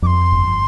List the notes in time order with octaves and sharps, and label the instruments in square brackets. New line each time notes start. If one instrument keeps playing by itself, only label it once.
[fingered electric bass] F2 [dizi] D6
[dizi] C6
[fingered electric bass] G1